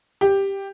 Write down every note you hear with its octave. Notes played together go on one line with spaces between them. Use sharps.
G4